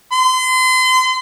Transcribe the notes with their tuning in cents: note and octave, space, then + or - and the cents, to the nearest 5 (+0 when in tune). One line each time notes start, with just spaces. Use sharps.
C6 -35